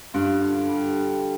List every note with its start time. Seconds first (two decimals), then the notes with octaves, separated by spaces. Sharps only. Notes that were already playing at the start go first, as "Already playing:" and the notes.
0.14 G2 F4
0.41 D3
0.68 G3